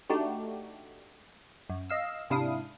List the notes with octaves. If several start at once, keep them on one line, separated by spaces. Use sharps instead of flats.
A3 D4 D#4 F#4 G4
F#2
D#5 F5 E6
G#2 C3 D4 E4 F5 D#6